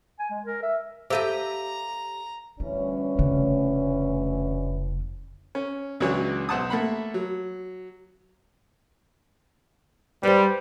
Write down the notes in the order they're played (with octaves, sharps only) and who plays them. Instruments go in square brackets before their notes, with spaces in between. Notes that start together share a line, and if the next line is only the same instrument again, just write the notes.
[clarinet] G#5
G#3
A#4
E5
[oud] G4 A4 B4 [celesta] C5 F5 D#7 [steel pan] E5 [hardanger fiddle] A#5
[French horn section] D2 E3 C#4 [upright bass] G3
[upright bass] F1 C#3
[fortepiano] C#4
C#2 E3 F#3 D4 C#5
B1 C5 F#5 A5 D#6
A3 A#3 F#5 B5
F#3
[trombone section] G3 [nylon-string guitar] B4 C5